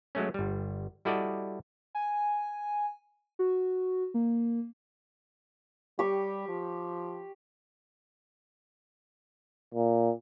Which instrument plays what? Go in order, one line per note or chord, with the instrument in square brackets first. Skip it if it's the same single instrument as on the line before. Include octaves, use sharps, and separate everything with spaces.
[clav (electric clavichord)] F#3 G#3 A3 C#4
G1 G3
G3 E4 F#4 A4 D5 D#5
[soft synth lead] G#5
F#4
A#3
[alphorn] G3 [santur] G4 C#6
[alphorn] F3
[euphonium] A#2